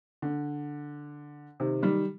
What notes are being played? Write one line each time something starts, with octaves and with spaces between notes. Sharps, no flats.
D3
C3 D#3
D#3 G3